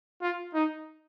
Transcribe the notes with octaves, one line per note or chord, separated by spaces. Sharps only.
F4
D#4